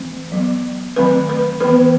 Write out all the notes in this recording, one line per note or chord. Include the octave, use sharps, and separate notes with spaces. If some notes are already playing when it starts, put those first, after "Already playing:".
Already playing: E3 A3 C4
F#3 B3
D#3 F#3 A3 C4 B4
B4
E3 B3 B4